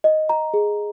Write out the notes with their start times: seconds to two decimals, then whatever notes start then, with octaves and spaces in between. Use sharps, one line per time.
0.04 D#5
0.29 A#5
0.54 G#4